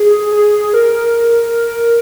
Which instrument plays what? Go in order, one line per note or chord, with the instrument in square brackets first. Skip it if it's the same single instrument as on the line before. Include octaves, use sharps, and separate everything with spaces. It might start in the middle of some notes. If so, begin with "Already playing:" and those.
Already playing: [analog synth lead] G#4
G#4
A#4